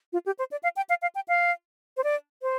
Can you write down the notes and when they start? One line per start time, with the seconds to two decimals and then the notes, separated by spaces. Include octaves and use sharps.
0.13 F4
0.26 G4
0.39 C5
0.51 D5
0.63 F5
0.76 G5
0.89 F5
1.02 F5
1.15 G5
1.28 F5
1.97 C5
2.04 D5
2.42 C5